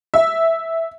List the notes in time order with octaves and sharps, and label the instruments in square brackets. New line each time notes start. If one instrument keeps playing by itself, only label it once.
[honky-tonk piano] E5